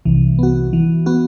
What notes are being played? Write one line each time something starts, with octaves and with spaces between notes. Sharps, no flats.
C2 C3 E3
B3 F#4
E3
B3 F#4